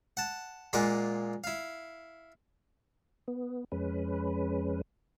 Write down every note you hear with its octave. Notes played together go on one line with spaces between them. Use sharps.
F#5 A5
A#2 G#3 F4 G#4 F#5 D6
E4 F5
B3
F2 G#3 C#4 B4